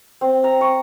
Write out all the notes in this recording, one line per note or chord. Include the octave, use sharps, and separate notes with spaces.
C4
A#5
C#6